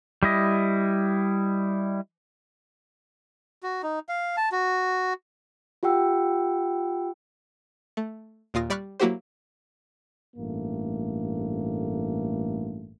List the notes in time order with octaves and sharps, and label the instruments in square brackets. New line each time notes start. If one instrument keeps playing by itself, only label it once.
[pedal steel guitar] G3 E4 D#5
[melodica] F#4
D#4
F5
A5
F#4
[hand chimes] F4 G4 F#5 G5 E6
[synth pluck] A3
D#2 A#2 F4 D#6 A#6
G3 D5 B5 C#6 F6 F#6
F#3 A#3 E4 F#4 G4 C5
[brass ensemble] A1 G2 A3 A#3